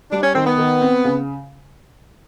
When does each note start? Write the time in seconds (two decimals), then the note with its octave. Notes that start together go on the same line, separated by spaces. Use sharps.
0.12 G3 D4
0.23 C#4
0.35 D#3 C4
0.47 B3
0.58 D#3
0.81 C4
1.05 C#3